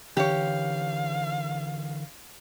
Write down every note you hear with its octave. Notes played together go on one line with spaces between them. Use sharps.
D3 E3 G4 C#5 F5